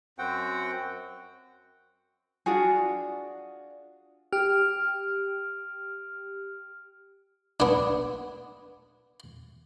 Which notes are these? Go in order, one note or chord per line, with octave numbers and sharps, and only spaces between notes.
F#2 C4 F#4 F#5 G5
D4 F4 F#4 G#4
G4 F6
B3 D4